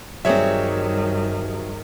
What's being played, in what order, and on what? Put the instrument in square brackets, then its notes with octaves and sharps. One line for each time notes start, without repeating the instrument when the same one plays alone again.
[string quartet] G2 D#3 [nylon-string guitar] F#3 G3 C4 [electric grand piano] G#4 C#5 E5